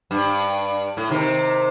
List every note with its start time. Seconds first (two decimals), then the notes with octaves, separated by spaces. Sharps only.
0.11 G2
0.97 A2
1.10 C3 D#3